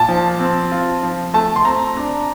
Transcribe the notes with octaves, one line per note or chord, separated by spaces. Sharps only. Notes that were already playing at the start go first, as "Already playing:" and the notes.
Already playing: A#2 A5
F3
C4
F4
F3
A3 A5
C6
C4 A#5
D4